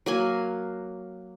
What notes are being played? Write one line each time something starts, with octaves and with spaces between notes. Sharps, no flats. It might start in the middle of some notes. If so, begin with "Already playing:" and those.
F#3 A#3 G#5